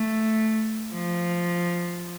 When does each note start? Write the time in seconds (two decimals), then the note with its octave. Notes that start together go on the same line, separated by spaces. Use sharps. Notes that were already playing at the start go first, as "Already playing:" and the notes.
Already playing: A3
0.92 F3